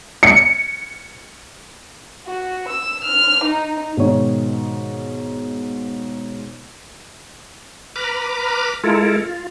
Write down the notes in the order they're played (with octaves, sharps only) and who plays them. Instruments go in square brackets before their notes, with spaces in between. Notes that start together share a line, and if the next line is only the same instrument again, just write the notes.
[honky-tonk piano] C#7
[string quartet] F#4
E6
F6
D#4
[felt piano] G#2 B2 D#3 C#5
[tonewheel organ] B4 A#5 B5 D6 F6
G#3 E4 F4 A4 A#4
F4